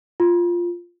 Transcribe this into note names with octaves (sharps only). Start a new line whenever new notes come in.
F4